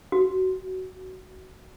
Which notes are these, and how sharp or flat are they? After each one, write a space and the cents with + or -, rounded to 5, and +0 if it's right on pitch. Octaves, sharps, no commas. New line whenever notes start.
F#4 +10